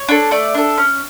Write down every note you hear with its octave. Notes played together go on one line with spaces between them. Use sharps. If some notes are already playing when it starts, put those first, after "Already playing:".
Already playing: C#5
D4 A4
A3 D5
D4 A4
C#4